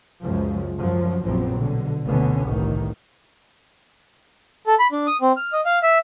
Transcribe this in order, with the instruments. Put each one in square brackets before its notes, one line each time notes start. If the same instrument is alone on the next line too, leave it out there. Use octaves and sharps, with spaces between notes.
[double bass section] C#2 F#2 F3 G#3
F#2 F3 F#3
A#1 F#2 F3 F#3 B3 C4
B2 D3
F1 D2 B2 D3 B3 C#4
G1 C2 A2 D#3
[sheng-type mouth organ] A4
B5
D4
D#6
C4
F6
D#5
F5
E5